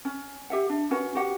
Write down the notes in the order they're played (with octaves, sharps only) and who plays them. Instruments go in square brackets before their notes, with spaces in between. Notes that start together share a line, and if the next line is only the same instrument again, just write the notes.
[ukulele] C#4
G4 E5 F#5
D4
C#4 F#4 B4 F#5
F#4 G4 F#5